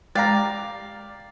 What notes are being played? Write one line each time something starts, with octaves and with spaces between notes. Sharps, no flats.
G#3 G4 D5 F5 A#5 A6